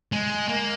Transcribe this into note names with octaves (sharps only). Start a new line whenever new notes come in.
G#3
A#3